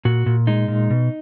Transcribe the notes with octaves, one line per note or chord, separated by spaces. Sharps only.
A#2 F#4
A#2
G#3 D#4
A#2
B2